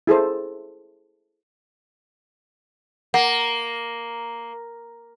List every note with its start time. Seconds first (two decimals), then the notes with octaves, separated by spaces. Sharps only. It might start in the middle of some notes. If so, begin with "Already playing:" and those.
0.07 E4 G#4 A4 C5
3.14 A#3 F#5